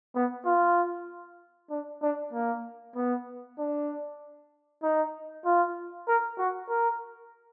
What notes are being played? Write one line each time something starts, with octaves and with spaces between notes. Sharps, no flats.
B3
F4
D4
D4
A#3
B3
D4
D#4
F4
A#4
F#4
A#4